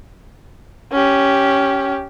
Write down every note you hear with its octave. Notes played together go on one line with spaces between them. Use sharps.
C#4 G4